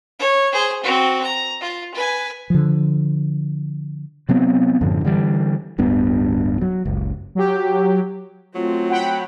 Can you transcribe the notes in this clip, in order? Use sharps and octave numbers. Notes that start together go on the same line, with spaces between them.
C#5
G#4 C5
C4 F#4
A#5
F4
B4 G#5
D3 F3
C3 F#3 B3 C4
F#2 A2 D3 F3
D3 E3 G3
D1 G2 B3
F#3
F#1 C#2
F#3 G4
F#3 A3 C4 F4
F#5 G5 B5